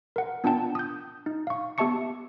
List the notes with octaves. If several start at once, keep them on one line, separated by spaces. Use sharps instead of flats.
A#4 F#5
B3 D4 F4 F#5 G5 A5
D#6 G6
D#4
F5 C#6
B3 G4 E5 A5 C#6 C#7